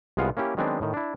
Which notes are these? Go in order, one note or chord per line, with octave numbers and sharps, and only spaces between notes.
C2 G#3 B3 F4 F5 F#5
A#3 C#4 E4 G4
D#3 F#3 G#3 B3 C4 D4
A2 D#3
D4 E4